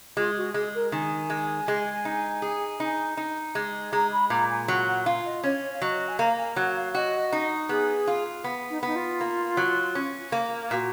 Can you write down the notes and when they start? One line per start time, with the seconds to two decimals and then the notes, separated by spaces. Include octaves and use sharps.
0.17 G#3 F4
0.36 F#4
0.54 G#3 G#4
0.74 A#4
0.92 D#3 G#5
1.30 G#3
1.68 G#3
2.05 D#4
2.42 G#4
2.80 D#4
3.17 D#4
3.55 G#3
3.93 G#3 A#5
4.11 B5
4.30 A#2 A#5
4.50 G#5
4.68 F#3 F#5
4.87 F#5
5.06 F4 F5
5.25 D#5
5.43 C#4 C#5
5.73 F5
5.81 F#3 D#5
6.08 G#5
6.19 A#3 A#5
6.37 G#5
6.56 F#3 F#5
6.76 F5
6.94 F#4 D#5
7.32 D#4
7.69 B3 G#4
8.07 F4
8.44 B3
8.69 D#4
8.83 B3 D#4
8.95 F4
9.21 A#3
9.57 F#3
9.95 C#4
10.32 A#3
10.71 A#2 F#4